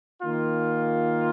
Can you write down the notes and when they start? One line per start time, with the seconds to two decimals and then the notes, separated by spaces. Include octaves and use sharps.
0.22 D#3 A#3 F4